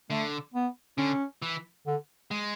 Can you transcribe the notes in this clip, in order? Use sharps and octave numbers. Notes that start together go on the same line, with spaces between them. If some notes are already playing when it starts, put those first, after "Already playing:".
D3 A3
B3
D3 C#4
E3
D3
G#3